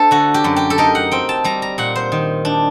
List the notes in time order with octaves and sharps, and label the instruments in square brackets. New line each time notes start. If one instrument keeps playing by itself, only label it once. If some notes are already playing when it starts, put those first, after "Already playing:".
Already playing: [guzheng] A3 D4 A4 C5
D3 F#4
G4
F#2
G4
A4
D#4 A#4
F#5
C4 G5
A5
G3 A#5
A#5
A#2 F#5
C5
D#3
D4